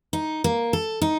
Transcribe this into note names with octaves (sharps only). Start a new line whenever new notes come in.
D#4
A#3
A4
D#4